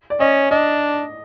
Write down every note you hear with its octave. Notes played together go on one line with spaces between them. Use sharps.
D5
C#4 D#5
D4 D#5